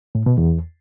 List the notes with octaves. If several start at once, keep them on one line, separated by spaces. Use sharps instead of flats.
A2
B2
E2